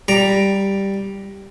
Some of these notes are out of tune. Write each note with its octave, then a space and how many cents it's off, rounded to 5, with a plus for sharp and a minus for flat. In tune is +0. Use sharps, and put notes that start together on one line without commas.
G3 +0 A#5 +0